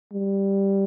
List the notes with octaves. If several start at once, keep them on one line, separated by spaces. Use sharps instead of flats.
G3